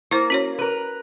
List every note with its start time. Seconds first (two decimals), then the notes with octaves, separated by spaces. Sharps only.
0.11 A#3 E4 C5
0.30 C#4 F#4 C#5
0.59 A#4 B4